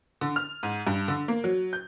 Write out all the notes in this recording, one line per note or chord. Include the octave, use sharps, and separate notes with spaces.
D3
F6
G#2
G2
D3
A#3
F#3
G6